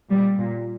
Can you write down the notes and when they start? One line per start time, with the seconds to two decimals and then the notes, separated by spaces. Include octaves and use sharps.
0.10 A#2 G3
0.39 A#2